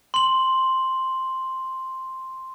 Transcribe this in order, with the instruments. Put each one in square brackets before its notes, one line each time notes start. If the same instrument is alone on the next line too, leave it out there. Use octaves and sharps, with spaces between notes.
[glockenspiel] C6 F#7